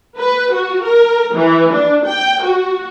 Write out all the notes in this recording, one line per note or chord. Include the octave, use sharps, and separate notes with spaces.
B4
F#4
A#4
E3
D4
G5
F#4